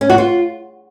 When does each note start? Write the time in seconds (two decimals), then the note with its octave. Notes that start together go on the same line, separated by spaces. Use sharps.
0.01 C#4
0.10 F#4
0.18 F4